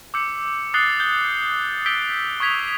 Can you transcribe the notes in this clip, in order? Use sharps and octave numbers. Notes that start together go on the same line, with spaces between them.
D6 E6 G6 C#7
D#6 F#6 A6 C7 F#7 G7
G6 G7
D#6 E6 G6 B6 D7 G7
C#6 D#6 G#6 B6 F7